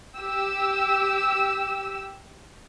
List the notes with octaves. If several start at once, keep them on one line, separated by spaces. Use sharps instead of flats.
G4 E6